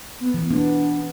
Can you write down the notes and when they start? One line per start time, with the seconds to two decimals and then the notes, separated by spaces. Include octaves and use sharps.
0.21 B3
0.34 E3
0.51 B3 D4